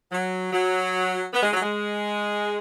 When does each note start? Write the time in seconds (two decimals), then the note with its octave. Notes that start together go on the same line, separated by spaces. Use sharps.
0.12 F#3
0.52 F#3
1.33 B3
1.43 G#3
1.53 F#3
1.62 G#3